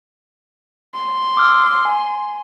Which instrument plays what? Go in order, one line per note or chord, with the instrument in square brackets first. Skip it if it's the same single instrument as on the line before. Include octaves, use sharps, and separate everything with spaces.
[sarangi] C6
[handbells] D6 E6 F6
G#5